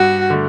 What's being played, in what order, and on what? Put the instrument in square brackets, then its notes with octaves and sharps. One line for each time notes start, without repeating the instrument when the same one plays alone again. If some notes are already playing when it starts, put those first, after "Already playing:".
Already playing: [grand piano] G2 [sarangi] F#4
[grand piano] D3 A3